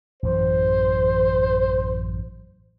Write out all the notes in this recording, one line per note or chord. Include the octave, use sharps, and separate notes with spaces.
A1 F#2 E3 C5